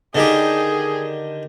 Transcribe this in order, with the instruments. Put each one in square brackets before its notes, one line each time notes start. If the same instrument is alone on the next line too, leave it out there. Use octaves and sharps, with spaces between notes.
[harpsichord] D3 D#3 G4 [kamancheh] G#4